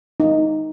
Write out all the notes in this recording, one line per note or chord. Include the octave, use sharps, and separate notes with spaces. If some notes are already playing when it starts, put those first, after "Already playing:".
D#4